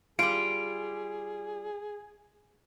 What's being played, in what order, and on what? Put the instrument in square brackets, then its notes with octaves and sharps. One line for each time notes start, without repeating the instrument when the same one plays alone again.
[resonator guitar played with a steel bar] G3 F4 [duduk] G#4 [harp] D7